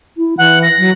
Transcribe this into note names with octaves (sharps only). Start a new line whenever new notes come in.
E4
E3 F#5
A#6
F#3